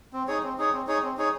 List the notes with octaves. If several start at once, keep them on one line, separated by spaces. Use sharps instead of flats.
C4
D#4 G#4 C#5
C4
D#4 G#4 C#5
C4
D#4 G#4 C#5
C4
D#4 G#4 C#5